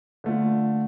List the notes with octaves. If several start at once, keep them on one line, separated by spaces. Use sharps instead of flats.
D3 A3 F4